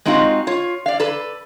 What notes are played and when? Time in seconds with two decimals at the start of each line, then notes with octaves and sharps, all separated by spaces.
0.05 G#3 C4 D#4 F4 F#4 F5
0.47 F4 C#5
0.86 D5 F5
1.00 A4 B4